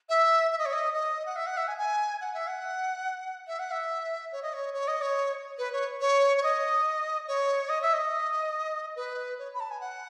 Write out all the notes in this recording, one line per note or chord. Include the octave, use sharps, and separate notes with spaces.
E5
E5
D#5
C#5
D#5
D#5
F#5
E5
F#5
E5
G#5
G#5
F#5
E5
F#5
E5
F#5
E5
C#5
D#5
C#5
C#5
D#5
C#5
B4
C#5
C#5
C#5
D#5
C#5
D#5
E5
D#5
B4
C#5
B5
A5
G#5
F#5